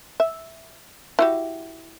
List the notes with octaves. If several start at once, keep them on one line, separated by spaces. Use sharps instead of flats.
E5
E4 F#4 G4